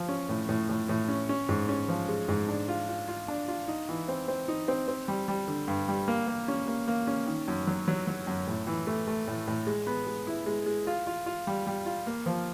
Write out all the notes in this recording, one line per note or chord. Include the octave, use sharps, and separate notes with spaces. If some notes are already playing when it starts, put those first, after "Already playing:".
Already playing: F3
C#4
A2
A2
A2
A2
C#4
C#4
G#2
C#4
F3
G#3
G#2
D4
F4
F4
F4
D4
F4
D#4
E3
C4
C4
D#4
C4
C4
G3
G3
D3
G2
G3
A#3
A#3
C#4
A#3
A#3
C#4
D#3
F#2
F#3
F#3
F#3
F#2
A2
E3
A3
A3
A2
A2
G#3
B3
G#3
E4
G#3
G#3
F4
F4
F4
G3
G3
F4
A#3
F3